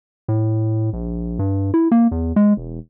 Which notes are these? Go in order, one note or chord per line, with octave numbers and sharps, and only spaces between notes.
A2
A#1
G2
E4
A#3
E2
G#3
E1